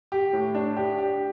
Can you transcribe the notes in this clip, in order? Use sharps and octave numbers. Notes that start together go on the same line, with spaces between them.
G4
A2
D4
G4
G4